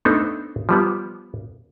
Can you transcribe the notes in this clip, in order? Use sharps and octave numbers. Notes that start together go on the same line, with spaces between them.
A3 B3 C4 D4 D#4 A4
F3 G3 B3